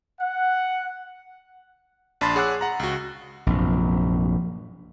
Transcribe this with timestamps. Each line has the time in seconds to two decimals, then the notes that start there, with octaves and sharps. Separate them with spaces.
0.21 F#5
2.21 A#1 D4 A5 B5 C6 A6
2.36 G#4 C#5 F#5 D6 E6 F#6
2.61 F#5 A#5
2.80 C#2 F#4
3.47 A#1 F#2 C3